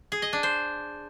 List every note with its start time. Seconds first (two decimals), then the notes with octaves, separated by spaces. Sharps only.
0.12 G#4
0.22 D#5
0.33 D4
0.43 C5